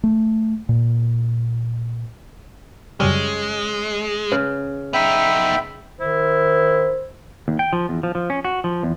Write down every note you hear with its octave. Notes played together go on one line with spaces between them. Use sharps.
A3
A#2
F#2 C#3 G3 G#3 C#4
C#3 B4
B3 D#4 E5 G5 B5
D#3 E4 C5
D#2
G5
F3
E2
F3
F3
C#4
F#4
F3
E2